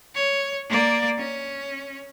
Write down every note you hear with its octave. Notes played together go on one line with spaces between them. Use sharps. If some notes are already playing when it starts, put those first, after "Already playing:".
C#5
A#3 D5
C#4